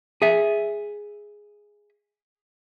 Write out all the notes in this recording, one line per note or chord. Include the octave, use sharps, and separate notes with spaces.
G#4 E5